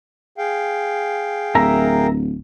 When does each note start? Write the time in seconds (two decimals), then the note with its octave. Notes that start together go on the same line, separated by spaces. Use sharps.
0.38 G#4 F5 G5
1.55 D1 A#4 E5 A#5